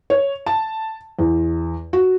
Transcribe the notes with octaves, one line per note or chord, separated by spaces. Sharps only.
C#5
A5
E2
F#4